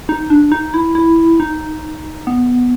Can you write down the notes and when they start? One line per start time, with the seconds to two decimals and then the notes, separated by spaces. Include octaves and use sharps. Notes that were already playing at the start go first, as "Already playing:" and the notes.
0.09 D#4
0.30 D4
0.52 D#4
0.74 E4
0.95 E4
1.40 D#4
2.27 B3